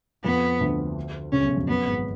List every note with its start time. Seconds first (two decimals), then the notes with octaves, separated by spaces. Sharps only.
0.24 F2 F3 B3
0.60 D2 D3
1.32 C#2 C#3 C#4
1.44 B1 B2
1.56 F2
1.68 F#2 B3
1.86 G#1 G#2